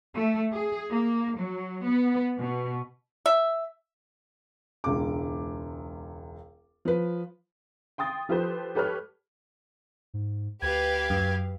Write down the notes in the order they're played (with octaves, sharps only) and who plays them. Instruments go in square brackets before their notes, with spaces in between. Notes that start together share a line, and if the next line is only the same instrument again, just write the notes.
[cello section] A3
G#4
A#3
F#3
B3
B2
[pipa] E5
[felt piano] E1 C#2 D6
F3 B4
[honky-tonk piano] G5 C6 D#6 A6
F3 F4 G4 A4 B4 C5
G4 A4 B4 C#5 F6
[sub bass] G#2
[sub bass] D2 [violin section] G4 B4 F5 [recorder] G#6
[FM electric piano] F#2